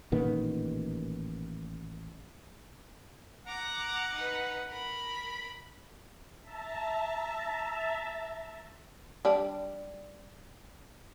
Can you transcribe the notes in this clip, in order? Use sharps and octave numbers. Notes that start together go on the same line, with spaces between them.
A1 A#2 D#3 B3
F#5 A#5 D6
D#4 B4
A#4 B5
E5 A5 A#5
G3 D4